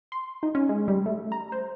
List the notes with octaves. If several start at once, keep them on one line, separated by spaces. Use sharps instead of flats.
C6
D#4
C#4
G#3
G3
A3
A#5
C5